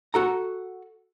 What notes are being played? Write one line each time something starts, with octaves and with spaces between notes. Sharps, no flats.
F#4 A4 A#5